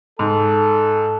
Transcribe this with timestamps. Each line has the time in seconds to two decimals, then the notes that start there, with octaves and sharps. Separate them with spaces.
0.19 G#2 A4